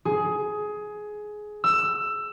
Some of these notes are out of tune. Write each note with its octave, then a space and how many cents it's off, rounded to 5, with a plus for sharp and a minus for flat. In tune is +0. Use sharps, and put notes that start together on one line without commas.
G#4 +15
E6 +15